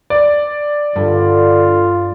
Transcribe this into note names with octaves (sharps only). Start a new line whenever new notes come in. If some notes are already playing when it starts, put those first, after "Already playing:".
D5
G2 D3 F4